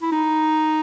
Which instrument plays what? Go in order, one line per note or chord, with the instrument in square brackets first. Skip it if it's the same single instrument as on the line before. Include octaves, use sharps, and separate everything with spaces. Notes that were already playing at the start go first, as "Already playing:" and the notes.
[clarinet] E4
D#4